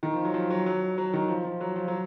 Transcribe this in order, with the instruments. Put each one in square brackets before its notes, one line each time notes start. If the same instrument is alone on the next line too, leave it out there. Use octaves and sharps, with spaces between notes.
[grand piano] D#3
F3
F#3
F3
F#3
F#3
F#3
D#3
F3
F3
F#3
F3
F#3